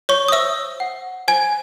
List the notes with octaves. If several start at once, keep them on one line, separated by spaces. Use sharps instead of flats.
C#5 C#6
D#6
C5 E5 E6
F#5
C5 G#5 G#6